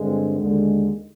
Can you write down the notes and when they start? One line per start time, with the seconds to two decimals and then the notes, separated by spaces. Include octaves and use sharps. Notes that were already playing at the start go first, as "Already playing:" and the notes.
Already playing: G2 D3 G#3 C4
0.39 D#2 D3 G#3